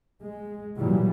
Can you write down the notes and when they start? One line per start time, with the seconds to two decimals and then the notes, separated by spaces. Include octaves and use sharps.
0.22 G#3
0.77 A#2 E3 F#3 G3